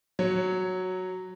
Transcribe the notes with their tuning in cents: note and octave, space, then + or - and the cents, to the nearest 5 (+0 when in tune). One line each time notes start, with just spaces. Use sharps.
F#3 +0 C#5 +0